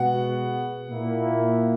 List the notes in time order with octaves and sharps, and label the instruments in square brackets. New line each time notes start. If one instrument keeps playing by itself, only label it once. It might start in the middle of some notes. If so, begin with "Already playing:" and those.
Already playing: [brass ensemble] B2 G#3 B3 F#4 [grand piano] F#5
[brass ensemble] A#2 A#3 E4